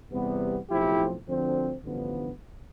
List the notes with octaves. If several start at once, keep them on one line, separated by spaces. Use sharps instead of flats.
E2 C3 G3 B3
B1 A2 F3 C4 E4 G4
D2 D3 F3 C4
A1 G2 D3 F3 B3